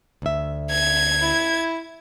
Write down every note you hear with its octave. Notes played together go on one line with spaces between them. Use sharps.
D2 E5
G#6
E4